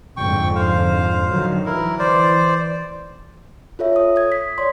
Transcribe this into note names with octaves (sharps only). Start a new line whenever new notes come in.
F2 G#2 D3 G5 C#6
C5 F5
D3 D#3 F#3
E3 E4 A#4
C5 D5
F4 A4 C#5 E5
C#5 D#6
D#6 G#6
B6
C#5 D5 C6